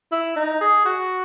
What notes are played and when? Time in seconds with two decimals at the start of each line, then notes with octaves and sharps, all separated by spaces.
0.12 E4
0.36 D#4
0.61 G#4
0.85 F#4